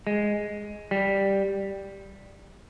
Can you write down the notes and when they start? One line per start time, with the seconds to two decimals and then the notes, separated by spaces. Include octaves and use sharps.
0.07 G#3
0.91 G3